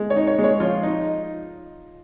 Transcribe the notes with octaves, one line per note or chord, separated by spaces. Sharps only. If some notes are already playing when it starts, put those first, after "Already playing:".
Already playing: G#3
C#5
D#4
C#5
G#3
C#5
F3 F4
D#4